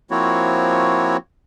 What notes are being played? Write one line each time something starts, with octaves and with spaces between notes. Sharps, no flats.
F3 A#3 C4 E4 F#4 C#5